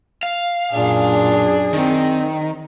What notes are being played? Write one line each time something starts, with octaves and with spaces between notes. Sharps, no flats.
F5
F#2 A#2 D4 G#4
D#3 C4